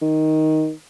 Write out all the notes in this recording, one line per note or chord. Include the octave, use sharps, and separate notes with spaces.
D#3